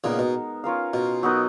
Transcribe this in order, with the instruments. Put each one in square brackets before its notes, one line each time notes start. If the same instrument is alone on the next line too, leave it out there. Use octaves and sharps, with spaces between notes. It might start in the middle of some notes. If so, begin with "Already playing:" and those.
[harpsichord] A#2 C#3 [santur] G#3 B3 D#4 A#4
[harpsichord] B2
[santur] C#4 F4 A#4 F5
[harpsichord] B2
[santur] F#3 B3 D#4 A#4